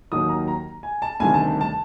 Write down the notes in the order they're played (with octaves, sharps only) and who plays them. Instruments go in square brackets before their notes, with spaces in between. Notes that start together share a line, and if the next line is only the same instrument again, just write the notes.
[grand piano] D#2 D#3 F#3 D#6
A#5
A#5
G#5
A5
D2 C3 D#3 G3 G#5
A5
A5